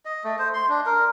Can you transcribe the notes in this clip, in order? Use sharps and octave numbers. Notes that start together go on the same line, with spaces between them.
D#5
A3
C5
C6
D4
A#4